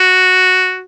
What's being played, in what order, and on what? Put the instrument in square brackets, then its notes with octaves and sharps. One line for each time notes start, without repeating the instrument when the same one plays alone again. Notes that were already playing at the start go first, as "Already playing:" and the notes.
Already playing: [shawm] F#4